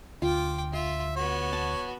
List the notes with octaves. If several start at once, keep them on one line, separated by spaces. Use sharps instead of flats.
D2 F4 G5 D6
F4 E5 C6
B3 F#4 C#5
A5